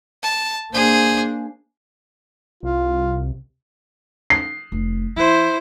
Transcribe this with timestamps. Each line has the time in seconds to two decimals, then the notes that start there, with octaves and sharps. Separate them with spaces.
0.23 A5
0.73 A#3 D4 G#4 C5
2.63 C2 F4
4.30 C7
4.72 F1
5.16 E3 E4 C5